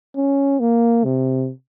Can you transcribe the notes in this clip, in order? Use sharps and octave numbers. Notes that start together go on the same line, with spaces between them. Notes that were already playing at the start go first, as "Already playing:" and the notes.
C#4
A#3
C3